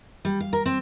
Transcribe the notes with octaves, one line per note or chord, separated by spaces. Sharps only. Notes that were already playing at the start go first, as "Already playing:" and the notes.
G3
F5
A#4
C4